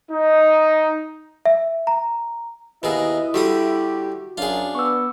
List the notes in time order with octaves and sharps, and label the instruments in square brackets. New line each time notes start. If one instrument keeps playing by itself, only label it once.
[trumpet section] D#4
[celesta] E5
A#5
[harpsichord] D#2 B2 G#4 [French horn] E4 [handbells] B4 [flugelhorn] D#5
[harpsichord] D3 G3 D#6 [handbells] F#4 [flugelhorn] G4
[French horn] F#2 [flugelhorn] D4 [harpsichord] F4 G#4
[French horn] B3 [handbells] C#6 D6 E6